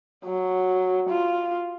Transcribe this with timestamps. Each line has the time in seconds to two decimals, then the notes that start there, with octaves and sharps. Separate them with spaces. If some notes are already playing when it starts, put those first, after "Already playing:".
0.25 F#3
1.09 F4